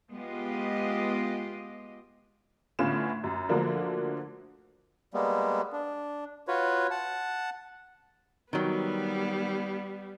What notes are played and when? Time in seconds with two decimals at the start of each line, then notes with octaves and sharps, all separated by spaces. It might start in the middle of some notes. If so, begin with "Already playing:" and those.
0.11 G#3 B3 F4 G4 D#5
2.79 A2 D3 B3 C#4 F4 E7
3.24 F#2
3.49 D3 F3 F#3 A3 A#3 D4
5.14 G3 G#3 A#3 B3
5.73 D4
6.48 F4 F#4 B4 C#5
6.91 F#5 A5
8.53 D#3 F#3 G3 B3